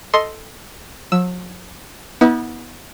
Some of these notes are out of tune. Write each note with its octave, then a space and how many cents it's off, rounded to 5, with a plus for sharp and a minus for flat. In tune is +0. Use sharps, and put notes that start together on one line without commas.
A4 +0 D#5 +10 C6 +0
F#3 -45 E6 +0
B3 -15 E4 -45